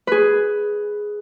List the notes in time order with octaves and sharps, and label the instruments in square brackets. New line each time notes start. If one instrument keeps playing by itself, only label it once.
[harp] G#4 B4